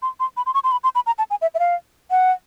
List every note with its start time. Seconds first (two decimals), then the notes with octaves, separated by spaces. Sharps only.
0.02 C6
0.20 C6
0.37 B5
0.46 C6
0.54 C#6
0.64 C6
0.72 B5
0.84 C6
0.95 B5
1.06 A#5
1.18 A5
1.30 G#5
1.42 E5
1.55 E5
1.59 F5
2.11 F#5